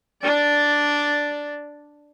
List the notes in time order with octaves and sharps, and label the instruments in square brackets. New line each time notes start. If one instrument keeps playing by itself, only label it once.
[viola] D4 D5